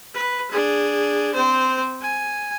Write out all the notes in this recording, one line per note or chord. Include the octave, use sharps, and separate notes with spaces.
B4
D4 G#4
C4 C5
G#5